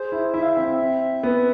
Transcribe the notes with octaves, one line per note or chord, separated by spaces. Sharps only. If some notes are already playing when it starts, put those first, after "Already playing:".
Already playing: G#4 C5
E4
E4 E5
F5
E5
C4
B3